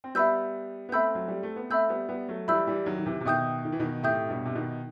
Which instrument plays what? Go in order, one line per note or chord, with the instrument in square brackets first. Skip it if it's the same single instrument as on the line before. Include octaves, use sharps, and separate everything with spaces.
[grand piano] C4
[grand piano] G3 B3 [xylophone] E5 B5 E6 G6
[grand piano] B3
[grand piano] A3 C4 [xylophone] E5 B5 E6 G6
[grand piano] F#3
G3
A3
B3
[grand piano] A3 C4 [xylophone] E5 B5 E6 G6
[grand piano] G3 B3
G3 B3
F#3 A3
[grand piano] E3 G3 [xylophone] E5 B5 E6 G6
[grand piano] E3 G3
D#3 F#3
D#3
C3 E3
C3
[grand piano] B2 D#3 [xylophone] E5 G5 D#6 G6
[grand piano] D#3
E3
B2 D#3
[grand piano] A2 C3 [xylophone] E5 G5 D#6 G6
[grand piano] G2 B2
C3
B2 D#3